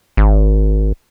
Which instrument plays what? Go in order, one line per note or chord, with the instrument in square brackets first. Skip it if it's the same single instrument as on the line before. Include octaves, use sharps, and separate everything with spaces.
[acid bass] G#1